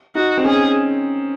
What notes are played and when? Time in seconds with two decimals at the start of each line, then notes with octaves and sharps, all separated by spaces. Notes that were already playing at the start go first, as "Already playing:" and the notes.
0.15 D#4 F#4
0.37 C4
0.44 C#4 G#4